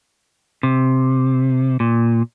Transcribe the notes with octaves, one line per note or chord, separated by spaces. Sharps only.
C3
A#2